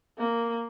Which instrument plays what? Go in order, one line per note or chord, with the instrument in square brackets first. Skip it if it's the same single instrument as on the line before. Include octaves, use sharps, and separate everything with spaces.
[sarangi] A#3